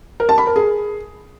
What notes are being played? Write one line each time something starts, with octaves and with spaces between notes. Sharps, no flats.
A#4
A5
B5
A#4
G#4